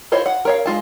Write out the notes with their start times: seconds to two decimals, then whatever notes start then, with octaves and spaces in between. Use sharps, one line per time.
0.12 E4 F4 C5 C#5 D#5
0.26 F#5
0.45 A#4 C#5 F5
0.66 G#3 F4 A5